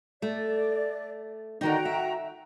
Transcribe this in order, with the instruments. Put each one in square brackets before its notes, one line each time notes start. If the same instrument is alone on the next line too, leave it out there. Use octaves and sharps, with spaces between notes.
[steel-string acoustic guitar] A3 [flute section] D5
[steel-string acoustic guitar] D3 D#3 D#4 [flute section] F#4 G5 A#5
[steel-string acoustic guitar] E5